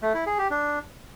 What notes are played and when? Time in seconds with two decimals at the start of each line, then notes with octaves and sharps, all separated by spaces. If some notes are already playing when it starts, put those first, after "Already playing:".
0.02 A3
0.14 E4
0.26 G#4
0.38 G4
0.50 D4